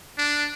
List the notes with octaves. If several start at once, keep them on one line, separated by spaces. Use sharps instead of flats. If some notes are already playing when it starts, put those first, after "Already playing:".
D4